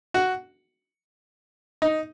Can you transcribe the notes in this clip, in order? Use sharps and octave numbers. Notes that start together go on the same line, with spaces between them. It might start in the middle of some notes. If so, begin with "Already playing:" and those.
F#4
D#4